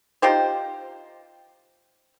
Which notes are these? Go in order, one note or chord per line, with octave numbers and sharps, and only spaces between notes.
D#4 F4 G4 C5